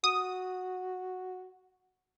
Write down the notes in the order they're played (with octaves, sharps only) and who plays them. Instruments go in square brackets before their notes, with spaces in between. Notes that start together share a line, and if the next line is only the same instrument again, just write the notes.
[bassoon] F#4 [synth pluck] D#6